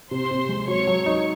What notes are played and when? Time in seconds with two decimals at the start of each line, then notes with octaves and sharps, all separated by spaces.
0.11 C3 C5 C6
0.31 C3
0.49 G#3
0.68 F#3 C#5 C#6
0.87 F#3
1.06 D#4